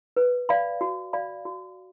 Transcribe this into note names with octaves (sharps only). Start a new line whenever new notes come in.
B4
D5 F5 B5
F#4
D5 F5 B5
F#4